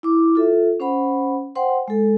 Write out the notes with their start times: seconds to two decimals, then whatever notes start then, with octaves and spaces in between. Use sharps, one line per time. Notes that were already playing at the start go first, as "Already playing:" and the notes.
0.03 E4 D6
0.35 F4 A4 E5
0.80 C#4 C5 F#5 B5
1.55 C5 F#5 G5 C6
1.88 G#3 A4